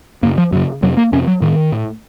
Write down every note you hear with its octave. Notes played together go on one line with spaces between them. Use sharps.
F#2 C#3 A#3
F3
F#2 C#3 F#3
F2 C3 F#3
A#3
F2 C3 C#4
F#3
A2 D#3
A2